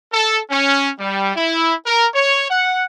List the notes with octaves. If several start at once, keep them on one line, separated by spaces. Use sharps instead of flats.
A4
C#4
G3
E4
A#4
C#5
F#5